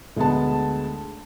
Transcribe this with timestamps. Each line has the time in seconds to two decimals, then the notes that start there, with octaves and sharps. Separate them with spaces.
0.16 D2 G#3 B3 A5